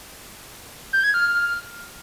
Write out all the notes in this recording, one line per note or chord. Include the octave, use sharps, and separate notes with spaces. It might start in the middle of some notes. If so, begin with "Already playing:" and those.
G6
G#6
F6